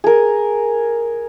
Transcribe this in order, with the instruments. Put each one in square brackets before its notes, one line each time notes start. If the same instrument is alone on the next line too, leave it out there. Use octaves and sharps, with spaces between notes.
[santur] G#4 A#4